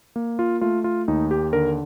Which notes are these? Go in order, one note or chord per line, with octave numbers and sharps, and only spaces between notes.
A#3
F4
A3 F4
F4
D#2 D#4
G4
D3 A#4